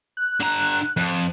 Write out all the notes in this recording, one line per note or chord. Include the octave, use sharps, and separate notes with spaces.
F#6
D3 A#5
F2